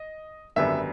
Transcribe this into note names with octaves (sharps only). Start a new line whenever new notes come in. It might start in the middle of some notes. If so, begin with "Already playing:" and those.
Already playing: D#5
G#1 F#2 D3 G3 B3 E5